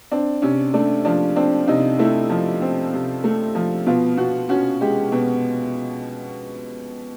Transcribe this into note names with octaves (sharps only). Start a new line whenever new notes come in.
C4 D4
C3 C#4
A3 D4
F3 D4
C4 D4
C3 D#4
A3 E4
F3
C4
C3
A3
F3
B2 F4
B2 F#4
C#4 F#4
G#3 G4
B2